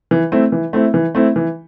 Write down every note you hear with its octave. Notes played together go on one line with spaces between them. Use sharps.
E3
A3 C4 E4
E3
A3 C4 E4
E3
A3 C4 E4
E3